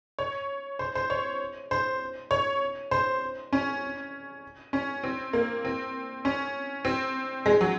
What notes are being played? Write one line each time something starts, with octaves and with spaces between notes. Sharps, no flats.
C#5
C5
C5
C#5
C5
C#5
C5
C#4
C#4
C4
A#3
C4
C#4
C4
G#3
F#3